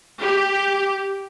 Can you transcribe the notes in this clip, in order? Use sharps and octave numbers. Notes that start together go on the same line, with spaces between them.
G4